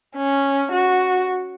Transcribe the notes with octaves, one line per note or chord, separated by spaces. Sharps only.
C#4
F#4